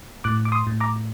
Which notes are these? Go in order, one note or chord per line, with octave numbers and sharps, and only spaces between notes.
A2 D6 F#6
D6
C6 D#6
A2
A#5 D6